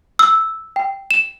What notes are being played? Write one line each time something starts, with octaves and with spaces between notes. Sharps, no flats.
E6
G5
E7